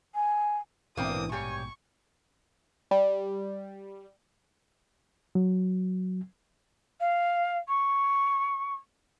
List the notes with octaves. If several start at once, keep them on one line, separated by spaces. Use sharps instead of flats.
G#5
A#1 G#2 B2 E3 A#3 C4 D4 D#6
G2 G4 C#5 G#5 C#6
G3
F#3
F5
C#6